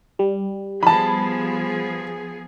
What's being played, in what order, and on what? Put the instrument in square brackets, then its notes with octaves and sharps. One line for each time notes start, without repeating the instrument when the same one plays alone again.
[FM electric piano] G3
[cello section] F3 B3 G#4 [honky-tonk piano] A5 B5